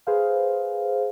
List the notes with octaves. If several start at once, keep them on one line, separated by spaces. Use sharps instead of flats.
G#4 B4 C5 F5